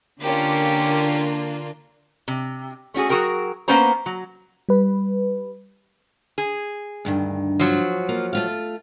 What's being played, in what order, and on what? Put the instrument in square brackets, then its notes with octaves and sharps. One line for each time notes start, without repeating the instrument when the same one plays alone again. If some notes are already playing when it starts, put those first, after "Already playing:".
[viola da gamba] D3 [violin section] A#3 D4 F4 [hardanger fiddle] C#4 G4
[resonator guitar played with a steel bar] C3
A3 C#4 F#4 G#4
F#3 F#4 G#4 A#4 G5
A#3 B3 C#4 C5 A#5
F#3
[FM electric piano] G3 B4
[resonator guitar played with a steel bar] G#4
[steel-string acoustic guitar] D2 G2 D#3
[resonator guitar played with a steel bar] F3 F#3
[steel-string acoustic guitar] A#3 F4
A3 F4 F5